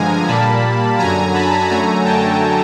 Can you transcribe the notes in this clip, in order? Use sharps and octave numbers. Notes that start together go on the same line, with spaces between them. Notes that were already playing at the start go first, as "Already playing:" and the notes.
Already playing: G2 D3 F3 G#3 G#5 A#5
A#2 G3 A#3 A5 B5
F#2 D3 F#3 G#5 A#5
A5 B5
F#2 D3 F#3 A3 G#5 A#5
G5 A5